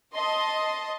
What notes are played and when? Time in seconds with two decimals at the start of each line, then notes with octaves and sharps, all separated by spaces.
0.14 D#5 A5 C6